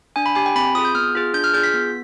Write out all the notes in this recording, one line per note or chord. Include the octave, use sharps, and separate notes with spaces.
D4 G#5
B5
G4 G#5
G5
C4 B5
F4 G#4 D#6
G6
B3 F6
F4 G#4
D4 G6
F6
F4 G#4 G6
B6
B3